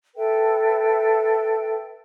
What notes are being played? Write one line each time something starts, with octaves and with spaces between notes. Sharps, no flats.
A4 B4 E5 G5